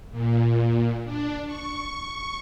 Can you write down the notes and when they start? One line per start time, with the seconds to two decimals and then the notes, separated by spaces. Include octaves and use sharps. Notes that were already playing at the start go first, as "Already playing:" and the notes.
0.11 A#2
1.04 D4
1.46 C#6